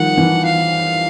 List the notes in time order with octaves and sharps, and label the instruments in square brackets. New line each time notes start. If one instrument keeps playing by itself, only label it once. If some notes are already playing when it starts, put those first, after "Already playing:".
Already playing: [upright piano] D#3 F3 G3 [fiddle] F#5
[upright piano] E3
[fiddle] F5